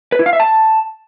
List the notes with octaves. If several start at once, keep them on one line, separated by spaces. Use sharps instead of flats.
B4
E4
F5
E5
A5